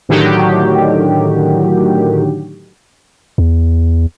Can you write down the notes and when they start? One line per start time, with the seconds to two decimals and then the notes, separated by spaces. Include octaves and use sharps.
0.09 A2 D3 D#3 F#3 F#4 G4
3.38 E2